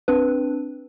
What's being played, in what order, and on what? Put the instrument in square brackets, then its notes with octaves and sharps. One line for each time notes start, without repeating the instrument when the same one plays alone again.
[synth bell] C4 D4 B4